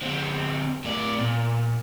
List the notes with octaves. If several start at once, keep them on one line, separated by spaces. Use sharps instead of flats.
D3 C4
A2 D5
A#2